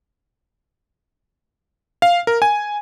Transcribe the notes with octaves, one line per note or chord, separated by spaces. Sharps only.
F5
A#4
G#5